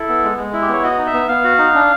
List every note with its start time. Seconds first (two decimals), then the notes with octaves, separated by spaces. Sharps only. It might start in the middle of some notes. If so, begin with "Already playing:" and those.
Already playing: E4 A4
0.09 B3
0.24 G#3
0.38 G#3
0.53 E4
0.62 G4
0.68 B3 C#5
0.83 F#4 D#5
0.98 D#4
1.07 E5
1.14 B3
1.29 B3 F5
1.44 F#4
1.59 D#4
1.75 D4